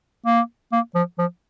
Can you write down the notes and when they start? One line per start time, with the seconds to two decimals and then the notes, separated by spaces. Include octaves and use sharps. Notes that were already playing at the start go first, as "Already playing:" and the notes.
0.26 A#3
0.72 A#3
0.95 F3
1.18 F3